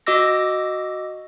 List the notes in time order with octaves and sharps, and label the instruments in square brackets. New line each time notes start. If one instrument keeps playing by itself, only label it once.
[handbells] F#4 D#5 D6 E6 A#6